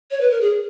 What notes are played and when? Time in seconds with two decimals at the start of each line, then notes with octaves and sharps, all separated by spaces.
0.11 C#5
0.21 B4
0.30 A#4
0.41 G#4